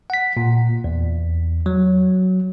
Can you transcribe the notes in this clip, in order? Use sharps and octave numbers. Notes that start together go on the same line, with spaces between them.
F#5 B6
A#2
E2
F#3